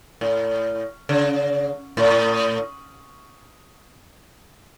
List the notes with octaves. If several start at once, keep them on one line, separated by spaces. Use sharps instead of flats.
A2
C#3
A2